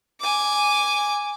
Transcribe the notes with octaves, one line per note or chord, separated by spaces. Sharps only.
G#5 D6